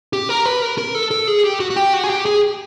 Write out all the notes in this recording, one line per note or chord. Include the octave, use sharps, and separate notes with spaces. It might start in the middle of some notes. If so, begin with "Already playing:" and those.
G4
A#4
B4
A#4
A#4
A4
A4
G#4
G4
F#4
F#4
G4
F#4
G#4
G4
G#4